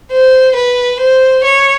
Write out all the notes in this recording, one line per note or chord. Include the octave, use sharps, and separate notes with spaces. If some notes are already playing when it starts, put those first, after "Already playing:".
C5
B4
C5
C#5